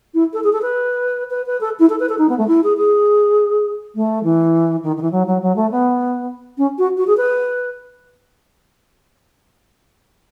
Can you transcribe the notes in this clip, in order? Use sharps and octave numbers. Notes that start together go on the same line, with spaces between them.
E4
A4
G#4
A4
B4
B4
B4
A4
E4
A4
B4
A4
D#4
B3
A3
E4
G#4
G#4
A3
E3
D#3
D#3
E3
F#3
F#3
F#3
A3
B3
C#4
F#4
F#4
G#4
B4